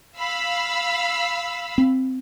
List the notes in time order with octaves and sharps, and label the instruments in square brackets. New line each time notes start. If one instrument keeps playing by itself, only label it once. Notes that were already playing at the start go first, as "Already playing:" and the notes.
[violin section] F5 B5 E6
[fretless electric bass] C4